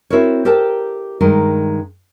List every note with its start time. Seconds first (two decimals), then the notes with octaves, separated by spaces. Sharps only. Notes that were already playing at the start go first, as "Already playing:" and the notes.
0.10 C4 C#4 E4 F#4 A#4 C#5
0.45 G4 A4 A#4 C5 G5 A5
1.21 G2 D#3 G#3 A#4